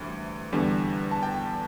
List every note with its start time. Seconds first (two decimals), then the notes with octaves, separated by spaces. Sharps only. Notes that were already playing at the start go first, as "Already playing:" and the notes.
Already playing: D2 C3 E3 G3
0.53 E2 D3 G3
1.11 A5
1.23 G5